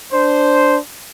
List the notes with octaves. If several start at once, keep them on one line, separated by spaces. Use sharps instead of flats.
D4 C5